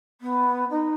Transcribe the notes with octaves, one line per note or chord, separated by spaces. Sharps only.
B3
D#4